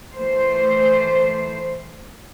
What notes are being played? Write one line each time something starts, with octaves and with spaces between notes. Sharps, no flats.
E3 A3 C5